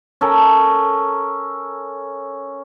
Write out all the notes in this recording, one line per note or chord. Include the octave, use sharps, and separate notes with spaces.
C#4 A4 A#4